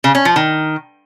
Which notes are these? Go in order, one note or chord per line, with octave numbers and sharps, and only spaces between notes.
C#3
C#4
F3
D#3